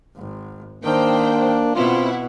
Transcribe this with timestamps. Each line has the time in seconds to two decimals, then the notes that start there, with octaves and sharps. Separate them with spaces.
0.16 G#1
0.84 D#3 A#3 D4 C5 G5
1.76 B2 C4 E4 F4 F#5